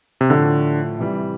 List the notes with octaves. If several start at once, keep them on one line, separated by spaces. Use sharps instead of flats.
C3
A2 D3 F3 A3
C3 E3 G3